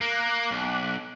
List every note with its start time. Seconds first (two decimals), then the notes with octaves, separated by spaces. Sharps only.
0.01 A#3 D6 F#6
0.51 B1